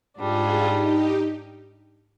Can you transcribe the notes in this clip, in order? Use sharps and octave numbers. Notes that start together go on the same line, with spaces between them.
G#2 G3 D4 F4 G#4
D#4 G4